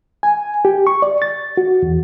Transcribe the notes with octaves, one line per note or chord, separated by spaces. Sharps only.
G#5
G4
C#6
D5
A6
F#4
E2